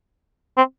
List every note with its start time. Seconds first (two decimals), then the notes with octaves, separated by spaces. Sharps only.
0.57 C4